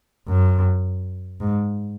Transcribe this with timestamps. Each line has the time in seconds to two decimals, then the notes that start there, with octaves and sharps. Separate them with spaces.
0.28 F#2
1.40 G#2